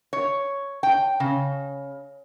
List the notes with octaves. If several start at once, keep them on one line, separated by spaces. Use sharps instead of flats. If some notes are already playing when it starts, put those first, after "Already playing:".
C#5
G5
C#3